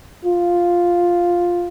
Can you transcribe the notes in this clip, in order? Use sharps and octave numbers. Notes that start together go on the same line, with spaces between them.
F4